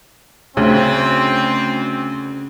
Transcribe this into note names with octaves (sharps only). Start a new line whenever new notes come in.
D2 C#3 C4